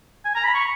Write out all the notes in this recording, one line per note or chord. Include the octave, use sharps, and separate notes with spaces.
G#5
A#5
B5
C#6